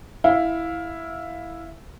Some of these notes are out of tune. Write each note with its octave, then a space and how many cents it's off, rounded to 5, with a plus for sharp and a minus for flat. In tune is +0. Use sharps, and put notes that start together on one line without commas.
E4 +0 F5 +15